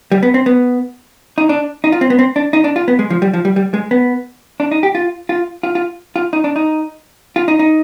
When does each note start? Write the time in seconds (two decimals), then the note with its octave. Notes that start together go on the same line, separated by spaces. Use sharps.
0.12 G3
0.23 B3
0.34 C4
0.46 B3
1.38 D#4
1.49 D4
1.84 D#4
1.92 F4
2.01 C4
2.10 B3
2.19 C4
2.36 D4
2.53 D#4
2.64 D4
2.76 F4
2.88 B3
2.99 G#3
3.10 F3
3.22 G3
3.33 F3
3.45 G3
3.56 G3
3.74 G#3
3.91 B3
4.60 D4
4.71 D#4
4.83 G4
4.95 F4
5.29 F4
5.63 F4
5.75 F4
6.16 F4
6.33 D#4
6.44 D4
6.56 D#4
7.36 F4
7.48 D#4
7.59 D#4